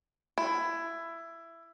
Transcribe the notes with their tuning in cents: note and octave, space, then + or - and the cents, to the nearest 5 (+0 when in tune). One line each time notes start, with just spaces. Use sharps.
E4 +15